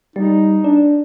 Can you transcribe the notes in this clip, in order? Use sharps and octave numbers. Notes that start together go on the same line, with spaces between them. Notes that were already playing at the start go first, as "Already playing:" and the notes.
G3 D#4
D4